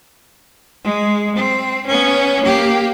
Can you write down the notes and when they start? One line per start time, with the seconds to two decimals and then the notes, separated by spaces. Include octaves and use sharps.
0.84 G#3
1.36 C4
1.87 B3 C#4
2.42 A#3 G4